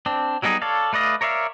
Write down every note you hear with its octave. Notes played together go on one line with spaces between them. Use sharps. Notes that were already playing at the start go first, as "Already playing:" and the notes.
C4 D4
F#3 G3 B3 D#4 G#4
A4 C#5 D5 F5
A3 B4 D5 D#5 F5
A#4 C#5 D5 E5 F5